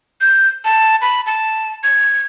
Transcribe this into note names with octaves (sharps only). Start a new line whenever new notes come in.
G6
A5
B5
A5
G#6